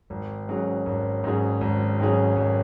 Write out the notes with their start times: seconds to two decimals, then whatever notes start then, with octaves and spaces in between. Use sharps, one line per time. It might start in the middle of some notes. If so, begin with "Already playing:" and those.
0.10 G#1
0.48 G#2 F#3 C#4 G#4
0.86 G#1
1.24 G#2 F#3 C#4 G#4
1.61 G#1
1.99 G#2 F#3 C#4 G#4
2.36 G#1